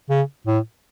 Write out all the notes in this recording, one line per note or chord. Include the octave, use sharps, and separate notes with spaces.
C#3
A2